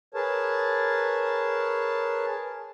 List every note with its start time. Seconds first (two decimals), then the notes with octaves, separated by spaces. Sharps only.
0.14 G#4 A#4 B4 C#5 A5